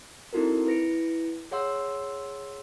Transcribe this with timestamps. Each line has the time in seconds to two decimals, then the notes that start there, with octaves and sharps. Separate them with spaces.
0.33 C4 D#4 E4 F#4 A4 A#4
0.66 E4 B4 A#6 C#7 D7
1.51 G#4 C#5 F#5 C6 E6